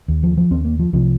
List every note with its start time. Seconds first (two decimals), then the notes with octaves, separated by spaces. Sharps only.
0.08 D#2
0.23 F3
0.37 F3
0.51 D#2 C4
0.65 A#3
0.79 F3
0.93 C2 C3 F3